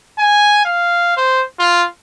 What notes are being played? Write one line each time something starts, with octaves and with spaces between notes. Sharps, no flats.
G#5
F5
C5
F4